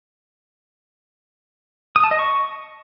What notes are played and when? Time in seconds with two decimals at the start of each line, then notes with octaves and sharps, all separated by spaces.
1.96 D#6
2.04 A5
2.11 D#5
2.19 C#6